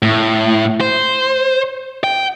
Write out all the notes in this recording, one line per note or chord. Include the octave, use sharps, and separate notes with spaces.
A2
C5
G5